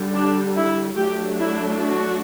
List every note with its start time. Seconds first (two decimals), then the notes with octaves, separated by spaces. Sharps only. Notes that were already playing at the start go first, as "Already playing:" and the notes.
Already playing: D3 G3
0.15 D4
0.56 E4
0.97 F#3 A3 D4 G4
1.39 E4
1.81 F#4